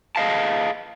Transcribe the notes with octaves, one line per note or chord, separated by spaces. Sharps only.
G#4 D#5 F5 A5